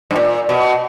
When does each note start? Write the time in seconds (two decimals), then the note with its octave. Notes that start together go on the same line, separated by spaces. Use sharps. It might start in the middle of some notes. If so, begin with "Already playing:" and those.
0.11 G2
0.15 A#2
0.49 B2